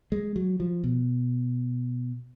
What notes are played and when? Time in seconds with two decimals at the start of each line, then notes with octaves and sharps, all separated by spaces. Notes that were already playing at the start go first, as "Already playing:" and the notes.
0.12 G#3
0.36 F#3
0.60 F3
0.84 B2